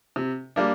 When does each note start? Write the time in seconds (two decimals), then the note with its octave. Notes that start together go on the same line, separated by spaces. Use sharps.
0.16 C3
0.56 G3 A#3 D4